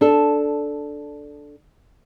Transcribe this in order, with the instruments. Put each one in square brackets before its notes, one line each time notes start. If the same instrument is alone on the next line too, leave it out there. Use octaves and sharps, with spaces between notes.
[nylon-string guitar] D4 A4